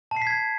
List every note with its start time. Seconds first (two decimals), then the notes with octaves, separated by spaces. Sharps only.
0.11 A5
0.16 C7
0.22 B6
0.27 G#6